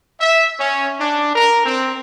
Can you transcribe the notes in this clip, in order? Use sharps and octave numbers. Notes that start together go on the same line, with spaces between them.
E5
C#4
D4
A#4
C4